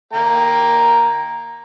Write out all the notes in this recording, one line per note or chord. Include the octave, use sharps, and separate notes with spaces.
A#3 G5 A#5